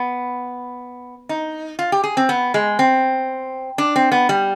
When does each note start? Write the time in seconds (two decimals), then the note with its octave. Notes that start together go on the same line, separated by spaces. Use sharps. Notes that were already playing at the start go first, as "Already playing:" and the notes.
Already playing: B3
1.29 D#4
1.79 F4
1.92 G4
2.04 G#4
2.17 C4
2.29 B3
2.54 G#3
2.79 C4
3.78 D4
3.96 C4
4.12 B3
4.29 G3